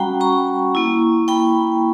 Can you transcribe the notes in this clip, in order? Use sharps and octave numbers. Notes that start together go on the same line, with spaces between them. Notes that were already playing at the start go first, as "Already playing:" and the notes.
Already playing: G3 C#4 F#4 F#5 G5 A#5 B5
A#5 C#6
A#3 E4
G5 B5